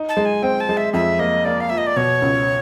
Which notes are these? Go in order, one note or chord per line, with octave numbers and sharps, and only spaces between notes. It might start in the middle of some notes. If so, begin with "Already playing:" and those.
Already playing: D#4
A5
G#3
G#5
C4 G5
A5
G#3
E5
F2 E5
A#3 D#5
A#3 D5
F5
F3 E5
D#5
D5
B2 C#5
C#2